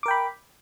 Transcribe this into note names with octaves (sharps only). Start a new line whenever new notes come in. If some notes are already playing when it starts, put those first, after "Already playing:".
A#4 G5 B5 D6